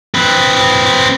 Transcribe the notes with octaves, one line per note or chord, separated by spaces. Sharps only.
C4 B4